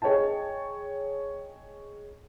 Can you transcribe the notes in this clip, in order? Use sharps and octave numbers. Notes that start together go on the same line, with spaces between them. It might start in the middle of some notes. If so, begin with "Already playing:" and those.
G#4 C#5 D#5 G5 A5